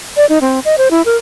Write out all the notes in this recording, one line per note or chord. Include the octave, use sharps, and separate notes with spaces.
D5
D#4
C4
D#5
C5
E4
A#4